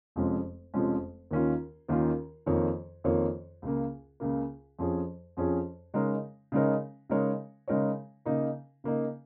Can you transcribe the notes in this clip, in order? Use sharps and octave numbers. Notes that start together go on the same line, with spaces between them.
F1 F2 F3 G#3 C#4
F1 F2 F3 G#3 C#4
D#2 D#3 C#4 F4
D#2 D#3 C#4 F4
F2 D#3 A#3 F4 C#5
F2 D#3 A#3 F4 C#5
C#2 C#3 A#3
C#2 C#3 A#3
F2 F3 C#4 G#4 C#5
F2 F3 C#4 G#4 C#5
C#3 G#3 D#4 A#4 C#5
C#3 G#3 D#4 A#4 C#5
C#3 G#3 D#4 A#4 C#5
C#3 G#3 D#4 A#4 C#5
C#3 A#3 D#4
C#3 A#3 D#4